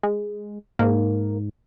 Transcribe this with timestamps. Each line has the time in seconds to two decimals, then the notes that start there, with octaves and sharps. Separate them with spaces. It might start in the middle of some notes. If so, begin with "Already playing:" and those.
0.03 G#3
0.79 G#2 A#3